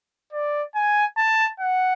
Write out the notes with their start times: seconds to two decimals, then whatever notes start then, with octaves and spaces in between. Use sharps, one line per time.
0.33 D5
0.75 G#5
1.17 A5
1.60 F#5